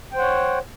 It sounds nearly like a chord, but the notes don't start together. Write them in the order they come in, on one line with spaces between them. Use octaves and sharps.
G5 C5 F#5 C#5